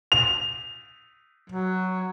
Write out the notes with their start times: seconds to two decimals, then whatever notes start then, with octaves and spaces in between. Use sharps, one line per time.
0.12 F7
1.50 F#3